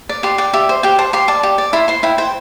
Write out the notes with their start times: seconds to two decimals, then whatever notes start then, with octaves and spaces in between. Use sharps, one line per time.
0.09 D5
0.23 G4 C6
0.38 D5 G5
0.53 G4 E5
0.69 C5
0.83 G4 G5
0.99 C5 A5
1.13 G4 C6
1.28 D5 A5
1.43 G4 A5
1.58 D5
1.73 E4 C6
1.88 C5 C6
2.03 E4 G5
2.18 C5 G5